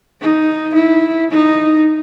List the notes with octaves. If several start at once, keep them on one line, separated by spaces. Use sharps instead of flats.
D#4
E4
D#4